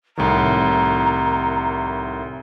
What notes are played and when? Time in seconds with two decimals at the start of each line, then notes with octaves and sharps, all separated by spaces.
0.17 C2 A2 D#3 A#5